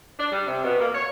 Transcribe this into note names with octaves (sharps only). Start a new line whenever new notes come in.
D4
G3
C3
B2
A#3
C#5